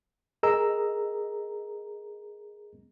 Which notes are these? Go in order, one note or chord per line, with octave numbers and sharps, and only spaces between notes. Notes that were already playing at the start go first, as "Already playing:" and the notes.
G#4 A#4 D#5 A#5 E6